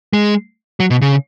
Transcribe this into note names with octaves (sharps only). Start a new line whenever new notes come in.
G#3
F#3
B2
C#3